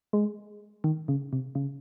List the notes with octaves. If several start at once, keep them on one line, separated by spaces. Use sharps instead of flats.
G#3
D#3
C#3
C3
C#3